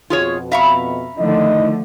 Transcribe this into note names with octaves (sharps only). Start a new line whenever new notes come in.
F2 B2 F4 G#4 C#5
E5 F5 A#5 B5 C#6
D3 D#3 F3 A3 E4 D#5